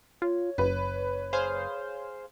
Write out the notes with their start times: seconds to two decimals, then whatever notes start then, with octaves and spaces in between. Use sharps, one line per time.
0.22 F4 C#5
0.58 F#1 B4
1.33 G#4 C5 F5